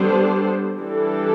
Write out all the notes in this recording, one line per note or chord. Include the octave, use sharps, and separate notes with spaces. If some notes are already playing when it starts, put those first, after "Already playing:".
Already playing: G3 B3 D4 A4 C5
E3 G3 D4 A4